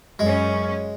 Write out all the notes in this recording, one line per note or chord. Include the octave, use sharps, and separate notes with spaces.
F#2 G#3 C#4